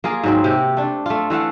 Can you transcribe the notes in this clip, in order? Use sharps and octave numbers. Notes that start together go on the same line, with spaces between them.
A#3 F4 G#4
G#2 F#3 C4
C3 G4
A3 D4
A3 F4
E3 A3 F5 F#5